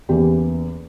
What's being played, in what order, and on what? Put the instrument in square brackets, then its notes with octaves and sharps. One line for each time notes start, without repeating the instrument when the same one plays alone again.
[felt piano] E2 C#3 E3 A#3 G4